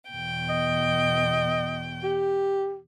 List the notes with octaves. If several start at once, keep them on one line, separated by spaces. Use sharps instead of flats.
E2 B2 G5
D#5
G4